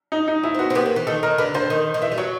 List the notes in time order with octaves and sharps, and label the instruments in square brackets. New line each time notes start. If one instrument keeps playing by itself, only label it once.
[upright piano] D#4
D#4
[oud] C#4 [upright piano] E4
[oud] C4
[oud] B3 [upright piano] F#4
[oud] C4
[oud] B3 [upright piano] G4
[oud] A#3
E3
[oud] D#3 [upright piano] A4
[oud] D#3 [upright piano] A#4
[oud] D3 [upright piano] B4
[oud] D3 [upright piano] C5
[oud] D#3
D#3
[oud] E3 [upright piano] E5
[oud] G3
[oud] F#3 [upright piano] C#5